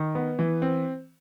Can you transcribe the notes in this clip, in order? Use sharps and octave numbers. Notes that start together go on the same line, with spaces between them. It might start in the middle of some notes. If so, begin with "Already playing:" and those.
Already playing: D#3
B3
E3
C4